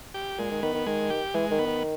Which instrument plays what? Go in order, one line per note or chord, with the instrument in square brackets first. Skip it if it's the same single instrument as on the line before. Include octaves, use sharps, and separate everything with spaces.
[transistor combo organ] G4
[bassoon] A#2 [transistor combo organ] G#3
[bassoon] D#3
[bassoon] D#3 [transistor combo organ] B3
[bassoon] D#3
[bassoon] D#3 [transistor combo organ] G#3
[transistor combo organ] G4
[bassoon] E3 [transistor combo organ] G#3
[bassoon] D#3
[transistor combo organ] B3
[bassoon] D#3